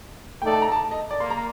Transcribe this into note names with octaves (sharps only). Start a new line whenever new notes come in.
A3 D#4 A4 D5 G5
A5
A#5
A5
D#5
D5
A#3 C6
A#5